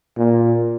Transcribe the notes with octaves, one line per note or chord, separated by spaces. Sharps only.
A#2